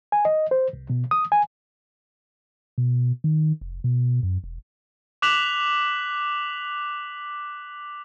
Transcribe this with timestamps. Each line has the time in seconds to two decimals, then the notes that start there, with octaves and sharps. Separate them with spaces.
0.12 G#5
0.25 D#5
0.51 C5
0.73 C2
0.90 B2
1.11 D#6
1.32 G#5
2.78 B2
3.24 D#3
3.61 F1
3.84 B2
4.23 F#2
4.44 E1
5.22 D6 F#6 B6 F7 F#7